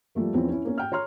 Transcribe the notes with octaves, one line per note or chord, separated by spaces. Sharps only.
F3 G3 A3 A#3
E2 F3 C4 C#4 E4
C#4 E4
A#3 C#4
G5 F6
C#5 A#5 C6 F6